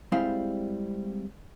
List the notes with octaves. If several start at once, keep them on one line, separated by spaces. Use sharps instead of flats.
G3 G#3 C4 E4 C5 F5